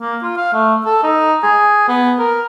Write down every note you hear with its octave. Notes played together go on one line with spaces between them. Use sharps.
A#3
F4
F5
A3
A4
D#4
G#4
B3
A#4